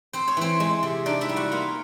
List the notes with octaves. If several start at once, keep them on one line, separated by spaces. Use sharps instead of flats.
C4 C5
C#5
E3 C4 C5
G#3
C3
D4 D#4 D5
E4 E5
G3
F#4 F#5
A#3 F4 F5